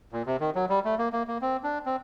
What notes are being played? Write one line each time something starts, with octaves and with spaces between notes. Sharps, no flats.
A#2
C3
D#3
F#3
G3
A3
A#3
A#3
A#3
C4
D4
C4